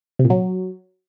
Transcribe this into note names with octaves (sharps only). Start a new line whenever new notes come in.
C3
A#2
F#3